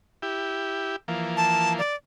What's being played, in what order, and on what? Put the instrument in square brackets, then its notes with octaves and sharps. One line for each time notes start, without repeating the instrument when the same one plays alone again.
[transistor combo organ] E4 G4
E3 F3 A#3
[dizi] A5
D5